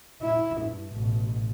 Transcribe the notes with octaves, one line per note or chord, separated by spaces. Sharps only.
E4
G2
A1 B2